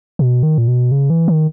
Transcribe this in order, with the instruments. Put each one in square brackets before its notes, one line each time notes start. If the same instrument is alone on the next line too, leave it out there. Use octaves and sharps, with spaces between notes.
[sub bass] B2
D#3
A#2
B2
C#3
E3
D#3